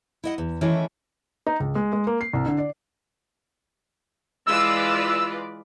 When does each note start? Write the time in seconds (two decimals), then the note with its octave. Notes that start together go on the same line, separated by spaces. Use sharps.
0.24 E4 D#5 F#5
0.38 E2
0.61 D#3 E3 A3 C#4 E4 C#5
1.47 D#4
1.60 C#2
1.75 G#3
1.93 G#3
2.07 A#3
2.21 C7
2.33 C2
2.46 D3
2.58 D5
4.47 E3 G#3 F4 B4 D5 E6